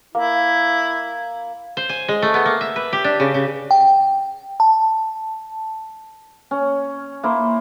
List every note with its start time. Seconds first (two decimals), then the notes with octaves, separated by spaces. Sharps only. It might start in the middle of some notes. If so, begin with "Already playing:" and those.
0.15 A#3 E4
1.77 C5
1.89 G#5
2.08 G#3
2.22 A3
2.34 B3
2.46 A#3
2.61 E5
2.76 B4
2.93 G4
3.04 D4
3.20 C#3
3.34 C#3
3.71 G5
4.60 A5
6.51 C#4
7.23 A#3 E4 C5